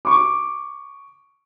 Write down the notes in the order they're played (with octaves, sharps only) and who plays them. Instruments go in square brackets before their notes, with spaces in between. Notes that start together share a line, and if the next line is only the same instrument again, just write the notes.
[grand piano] C#6 D6